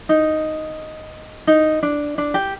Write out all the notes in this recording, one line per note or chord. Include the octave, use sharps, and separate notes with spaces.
D#4
D#4
D4
D4
G4